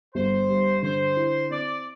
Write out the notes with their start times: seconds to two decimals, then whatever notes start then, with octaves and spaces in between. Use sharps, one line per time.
0.14 G1 C5
0.49 G2
0.82 D3 C5
1.17 E4
1.50 C4 D5